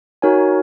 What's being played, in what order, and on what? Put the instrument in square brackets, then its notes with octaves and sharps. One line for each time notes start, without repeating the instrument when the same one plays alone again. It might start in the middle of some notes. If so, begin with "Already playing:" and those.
[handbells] D#4 F#4 A#4 C#5 G#5